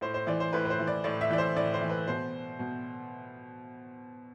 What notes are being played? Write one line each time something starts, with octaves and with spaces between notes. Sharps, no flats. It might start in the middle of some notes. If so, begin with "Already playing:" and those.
A2 C5
C5
E3 D5
C5
A2 B4
B4
C5
E3
D5
A2 D5
E5
E3 D5
C5
A2 D5
C5
E3
B4
B2 C5
B2